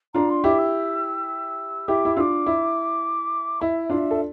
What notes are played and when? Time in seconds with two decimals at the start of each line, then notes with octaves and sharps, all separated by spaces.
0.14 D4 F4 A#5
0.30 C6
0.44 E4 G4 D6
0.58 E6
1.88 E4 G4 D6
2.05 E4
2.16 D4 F4 D6 E6
2.46 E4
3.61 E4 E5
3.90 D4 F4 E5
4.11 A4